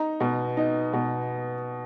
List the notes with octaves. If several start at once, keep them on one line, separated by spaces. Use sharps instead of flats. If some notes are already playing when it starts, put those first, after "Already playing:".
Already playing: D#4 A#5
B2
D#4
B2